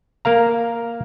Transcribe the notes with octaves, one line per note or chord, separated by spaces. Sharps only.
A#3 A#4 F5 A#5